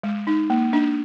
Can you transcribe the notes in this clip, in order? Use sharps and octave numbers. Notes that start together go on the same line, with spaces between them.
G#3
D#4
A#3
D4